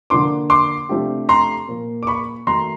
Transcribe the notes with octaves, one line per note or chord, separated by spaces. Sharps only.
D3 F3 A#3 D4 C6 D6
C6 D6
C3 F3 A3 D4 G4
A#5 C6
A#2 F3 A#3
D6
B5 C#6
D#3 F#3 A3 A#5 C6